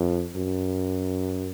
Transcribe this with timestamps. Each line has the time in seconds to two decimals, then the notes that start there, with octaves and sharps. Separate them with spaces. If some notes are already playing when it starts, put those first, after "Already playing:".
Already playing: F2
0.36 F#2